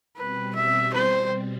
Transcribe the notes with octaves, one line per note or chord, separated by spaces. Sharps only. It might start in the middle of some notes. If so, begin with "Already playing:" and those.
B2 G3 C4 B4
E5
C5